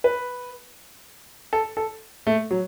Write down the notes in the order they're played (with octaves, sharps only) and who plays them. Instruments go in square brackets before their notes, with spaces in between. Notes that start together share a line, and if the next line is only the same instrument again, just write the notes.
[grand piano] B4
A4
A4
A3
F#3